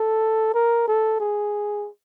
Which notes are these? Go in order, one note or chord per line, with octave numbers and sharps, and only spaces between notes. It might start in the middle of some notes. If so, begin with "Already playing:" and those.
Already playing: A4
A#4
A4
G#4